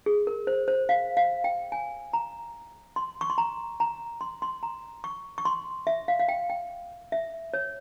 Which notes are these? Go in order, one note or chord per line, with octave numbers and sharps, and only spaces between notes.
G#4
A#4
C5
C5
F5
F5
G5
G#5
A#5
C6
C#6
C6
A#5
A#5
C6
C6
A#5
C#6
C#6
C6
E5
F5
F5
G5
G5
E5
C#5